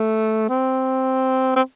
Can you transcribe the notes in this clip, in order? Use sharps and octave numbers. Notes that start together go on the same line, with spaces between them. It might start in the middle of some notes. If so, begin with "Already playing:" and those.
Already playing: A3
C4
C4